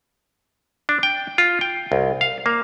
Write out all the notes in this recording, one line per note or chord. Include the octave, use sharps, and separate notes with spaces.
D4
G5
F4
G5
C2
F5
A#3